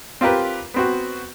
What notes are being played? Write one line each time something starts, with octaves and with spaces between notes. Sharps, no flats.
C4 F4 G4 A#4 B4
B3 C4 F#4